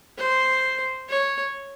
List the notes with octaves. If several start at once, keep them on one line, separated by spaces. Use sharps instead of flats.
C5
C#5